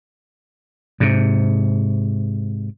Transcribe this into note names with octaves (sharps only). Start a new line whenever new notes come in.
G#2 C3